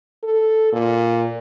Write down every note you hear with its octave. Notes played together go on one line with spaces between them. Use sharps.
A4
A#2